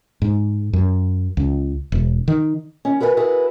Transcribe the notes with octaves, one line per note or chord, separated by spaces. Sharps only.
G#2
F#2
C#2
E1
D#3
D#3 C#4
F#4 A#4 B4 D#5 G#5
E4 F#4 G#4 A#4 B4